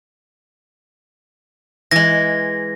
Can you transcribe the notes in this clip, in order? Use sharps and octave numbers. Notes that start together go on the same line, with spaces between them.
E3 G#3 A#6